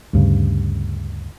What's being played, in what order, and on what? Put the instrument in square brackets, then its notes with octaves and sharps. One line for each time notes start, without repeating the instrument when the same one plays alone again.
[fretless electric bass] D2 G2 C#3